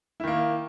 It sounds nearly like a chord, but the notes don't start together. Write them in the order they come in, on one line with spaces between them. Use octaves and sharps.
E4 D#3 A#3